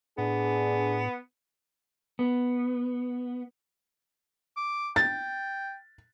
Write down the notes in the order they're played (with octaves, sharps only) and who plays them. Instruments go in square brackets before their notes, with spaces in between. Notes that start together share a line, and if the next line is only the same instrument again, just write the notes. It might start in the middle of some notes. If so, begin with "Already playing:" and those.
[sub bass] A2 [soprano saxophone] B3 [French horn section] D4 G#4
[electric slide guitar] B3
[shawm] D6
[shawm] G5 [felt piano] A6